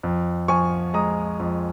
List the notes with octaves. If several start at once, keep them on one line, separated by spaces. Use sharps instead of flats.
F2
F3 G#5 C#6
G#3 A#5 D#6
F2